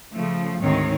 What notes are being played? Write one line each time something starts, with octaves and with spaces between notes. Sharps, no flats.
C#3 F3 A3
D2 G#2 D#3 C4 C#5